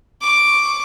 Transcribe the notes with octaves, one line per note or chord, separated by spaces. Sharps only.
C#6 D6